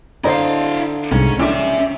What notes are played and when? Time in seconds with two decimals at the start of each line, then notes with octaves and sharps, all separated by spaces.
0.24 D3 D4 E4 C5 D#5 F5 A#5
1.12 C2 G#2 C#4
1.40 A#1 C#4 G4 E5